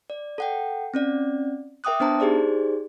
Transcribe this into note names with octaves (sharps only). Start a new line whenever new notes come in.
D5
A4 F#5 G5
C4 C#4 D5
A#4 E5 G5 D6 D#6 F#6
B3 D4 C5 A5 A#5
D#4 G4 G#4 C5 D5